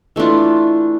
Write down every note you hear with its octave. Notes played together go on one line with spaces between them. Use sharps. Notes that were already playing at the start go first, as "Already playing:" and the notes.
E3 A3 D4 F4